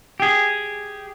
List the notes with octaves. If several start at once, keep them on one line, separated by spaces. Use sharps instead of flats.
G4 G#4